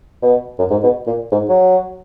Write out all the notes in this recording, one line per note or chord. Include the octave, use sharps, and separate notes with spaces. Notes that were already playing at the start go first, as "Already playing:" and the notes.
B2
F#2
G#2
B2
A#2
G#2
F#3